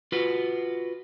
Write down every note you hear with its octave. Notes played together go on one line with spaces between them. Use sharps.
F4 F#4 B4